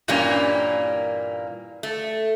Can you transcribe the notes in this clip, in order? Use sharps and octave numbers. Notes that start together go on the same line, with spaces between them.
G2 A#2 E3 G3 A#3 C#4
A3